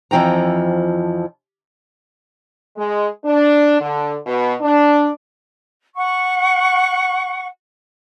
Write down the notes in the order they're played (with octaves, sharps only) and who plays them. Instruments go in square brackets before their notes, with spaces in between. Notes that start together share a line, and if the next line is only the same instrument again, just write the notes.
[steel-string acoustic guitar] F2 E3 F3 G5 A#5
[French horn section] G#3
D4
D3
B2
D4
[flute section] F#5 C#6